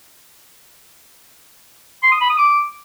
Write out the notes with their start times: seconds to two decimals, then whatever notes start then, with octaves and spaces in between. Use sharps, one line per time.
2.03 C6
2.12 D#6
2.21 B5
2.29 D#6
2.38 D6